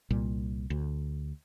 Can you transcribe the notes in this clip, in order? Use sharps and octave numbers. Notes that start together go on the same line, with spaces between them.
C2 A#2 G3
D2